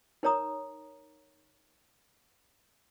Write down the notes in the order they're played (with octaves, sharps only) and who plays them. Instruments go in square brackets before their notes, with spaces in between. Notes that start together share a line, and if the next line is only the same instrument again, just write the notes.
[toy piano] D#4 A#4 C#5 A#5 D#6